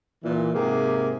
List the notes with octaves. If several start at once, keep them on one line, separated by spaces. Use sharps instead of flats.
A#2 E3
G#2 C3 A#3 G4 G#4